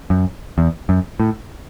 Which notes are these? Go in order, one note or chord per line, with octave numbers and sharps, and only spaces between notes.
F#2
E2
F#2
A2